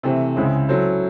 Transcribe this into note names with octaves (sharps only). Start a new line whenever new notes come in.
C3 E3 A3 C4
C#2 C#3 G#3 C4 E4
F#3 C#4 E4 A4 C5